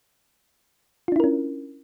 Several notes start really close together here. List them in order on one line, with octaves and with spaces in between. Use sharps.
F4 D4 E4 A#4 C#4